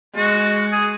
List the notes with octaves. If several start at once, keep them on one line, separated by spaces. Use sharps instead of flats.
G#3 F#4
G#4